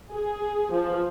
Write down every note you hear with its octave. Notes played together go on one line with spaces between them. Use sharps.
G#4
F3